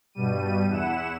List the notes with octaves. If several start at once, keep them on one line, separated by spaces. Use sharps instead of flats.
G2 B2 G3 D#7
E2 E4 F#5 E7